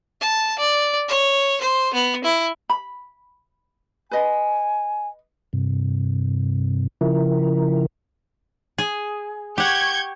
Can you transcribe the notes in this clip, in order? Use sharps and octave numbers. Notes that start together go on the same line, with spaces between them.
A5
D5
C#5
C5
B3
E4
B5
B4 D#5 G#5
G2 C3
C#3 F3 E4 A#4
G#4
G4 F#5 C#6 G6 G#6